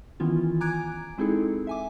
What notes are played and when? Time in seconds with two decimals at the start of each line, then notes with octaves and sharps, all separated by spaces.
0.20 D#3 E3 B3 C#4 E4 F4
0.61 G#5 A#5 D6 F#6 G#6 D7
1.18 G#3 C4 D#4 E4 G#4 A4
1.67 E5 G#5 D6